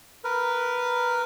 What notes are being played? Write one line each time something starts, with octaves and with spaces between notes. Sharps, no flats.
A#4 B4